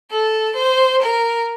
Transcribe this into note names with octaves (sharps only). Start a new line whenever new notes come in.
A4
C5
A#4